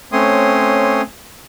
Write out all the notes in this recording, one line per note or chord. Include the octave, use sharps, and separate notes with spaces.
A3 C4 C#4 C#5 C6 D#6